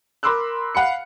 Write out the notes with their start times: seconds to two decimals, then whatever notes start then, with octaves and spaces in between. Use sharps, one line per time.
0.23 A#4 B5 C6 D6 E6 F#6
0.75 F5 F#5 B5 C#7